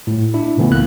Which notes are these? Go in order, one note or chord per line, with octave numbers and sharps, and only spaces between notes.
A2
D4 E4
A#2 C#3 E3 A3 B3
C#2 A#3 F#6